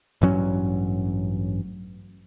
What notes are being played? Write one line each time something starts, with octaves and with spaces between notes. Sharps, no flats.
A1 G2 F#3 C#4